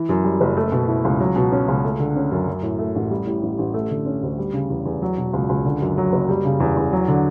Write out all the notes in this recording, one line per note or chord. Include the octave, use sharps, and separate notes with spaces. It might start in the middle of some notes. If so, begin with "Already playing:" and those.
Already playing: E3
F#2
G3
F#1
A3
B2
E4
C#2
F#3
B2
C#4
C#2
A3
D3
C#4
F#2
F#3
A2
A3
A1
G3
A2
A1
A1
A3
D3
C#4
D2
G3
C#3
E2
E2
F#3
B2
C#2
C#2
D3
F#2
F#3
F#1
G3
C#3
E2
E2
F#3
D3